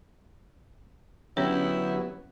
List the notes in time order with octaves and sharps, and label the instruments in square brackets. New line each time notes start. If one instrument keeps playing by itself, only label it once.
[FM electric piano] D3 G4 G6 [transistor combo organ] F#3 B3 [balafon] C#4 C#5 [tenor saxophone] E4